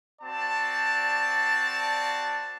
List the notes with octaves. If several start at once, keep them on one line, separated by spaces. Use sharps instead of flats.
C4 F#4 D5 A5